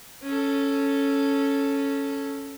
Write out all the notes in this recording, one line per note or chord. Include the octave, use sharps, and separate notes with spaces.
C#4 A4